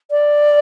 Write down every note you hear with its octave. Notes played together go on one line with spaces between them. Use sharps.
D5